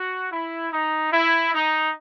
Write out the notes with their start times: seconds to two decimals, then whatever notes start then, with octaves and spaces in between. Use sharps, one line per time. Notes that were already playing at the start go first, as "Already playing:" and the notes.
Already playing: F#4
0.30 E4
0.71 D#4
1.12 E4
1.53 D#4